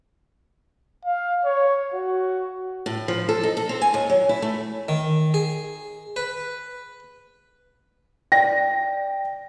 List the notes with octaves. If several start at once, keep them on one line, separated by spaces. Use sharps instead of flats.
F5
C#5
F#4
A2
F3
A4
D#4
A4
C4
G#5
D#2
F#3
E4
A3
D#3
G#4
B4
D5 G5 A#6